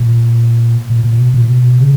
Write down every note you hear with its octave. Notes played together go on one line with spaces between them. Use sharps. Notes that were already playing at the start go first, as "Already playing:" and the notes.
Already playing: A#2
A#2
A#2
B2
A#2
B2
C#3